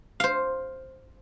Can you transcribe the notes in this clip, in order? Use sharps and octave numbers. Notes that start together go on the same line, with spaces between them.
C5 F5